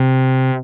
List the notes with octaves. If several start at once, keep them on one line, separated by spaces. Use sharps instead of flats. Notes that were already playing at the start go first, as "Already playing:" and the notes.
Already playing: C3